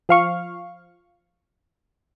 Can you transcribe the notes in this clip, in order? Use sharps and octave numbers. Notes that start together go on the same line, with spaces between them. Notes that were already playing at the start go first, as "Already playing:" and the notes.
F3 F5 C#6